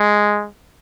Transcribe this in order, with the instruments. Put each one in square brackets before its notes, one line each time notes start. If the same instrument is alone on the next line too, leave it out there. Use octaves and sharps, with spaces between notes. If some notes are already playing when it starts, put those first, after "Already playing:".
Already playing: [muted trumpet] G#3